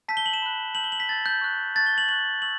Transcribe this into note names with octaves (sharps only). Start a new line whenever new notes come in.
A5 E6 G6 B6
G7
F#7
E7
B5 F#6
A5 E6 G6 F#7
G7
F#7
B6
A5 E6 G6 A6
G6
C#6 F#6
A5 C#6 F#6 A6
G7
F#7
C#6 F#6 F#7
C#6 E6 F#7